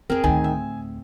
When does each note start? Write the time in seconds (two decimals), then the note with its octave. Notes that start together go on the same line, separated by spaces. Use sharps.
0.10 F2 C4 G#4 A#4
0.24 D2 A2 D#3 G#5
0.44 E5